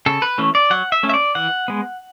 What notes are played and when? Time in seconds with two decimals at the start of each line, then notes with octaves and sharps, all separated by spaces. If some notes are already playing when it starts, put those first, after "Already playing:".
0.06 C#3 A4
0.22 B4
0.38 E3 A3 C#4
0.55 D5
0.70 F#3 F#5
0.92 E5
1.03 A3 C#4
1.09 E5
1.14 D5
1.35 E3 F#5
1.68 G#3 B3